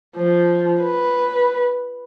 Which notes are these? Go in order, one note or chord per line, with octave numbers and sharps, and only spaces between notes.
F3
B4